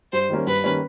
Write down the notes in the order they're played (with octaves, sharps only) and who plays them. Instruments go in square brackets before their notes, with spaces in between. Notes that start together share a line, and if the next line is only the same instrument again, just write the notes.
[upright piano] G2 [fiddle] C5
[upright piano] D#3 G3 A#3 C#4
[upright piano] G2 [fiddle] B4
[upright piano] D#3 G3 A#3 C#4